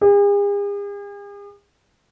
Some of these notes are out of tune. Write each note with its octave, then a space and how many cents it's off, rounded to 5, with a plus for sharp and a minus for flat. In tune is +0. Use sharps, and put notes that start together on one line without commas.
G#4 -45